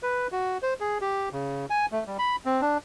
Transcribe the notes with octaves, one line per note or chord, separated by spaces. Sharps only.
B4
F#4
C5
G#4
G4
C#3
G#5
A3
G3
B5
C4
D4